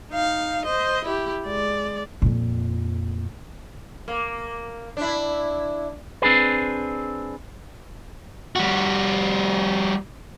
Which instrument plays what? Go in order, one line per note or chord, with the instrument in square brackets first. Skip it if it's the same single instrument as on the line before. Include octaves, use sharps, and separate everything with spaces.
[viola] D#4 F5
C5 D#5
E4 G4
G#3 D5
[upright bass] F2 A#2
[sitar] A#3
D4 E4
[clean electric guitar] C4 D4 G#4 B4
[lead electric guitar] G3 F#4